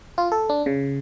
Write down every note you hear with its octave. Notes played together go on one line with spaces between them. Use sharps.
F4
A4
D4
C#3